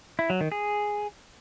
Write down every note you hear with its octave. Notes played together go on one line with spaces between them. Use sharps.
E4
F#3
D#3
G#4